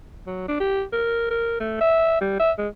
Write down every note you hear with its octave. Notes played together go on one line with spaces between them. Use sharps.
F#3
D4
G4
A#4
A#4
A3
E5
G3
E5
G#3